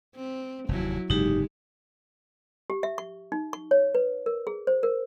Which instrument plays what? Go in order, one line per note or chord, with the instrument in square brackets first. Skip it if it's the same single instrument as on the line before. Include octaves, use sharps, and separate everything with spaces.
[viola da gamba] C4
[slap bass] F1 D#2 C3 [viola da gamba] F#3 E4
[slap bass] F#1 G#2 C3 [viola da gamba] G#3 [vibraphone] D#4 G4
[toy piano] G4
E5
C#6
D#4
C#6
C#5
B4
A#4
G#4
C5
A#4